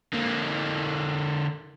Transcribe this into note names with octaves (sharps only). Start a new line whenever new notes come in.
D3 A#3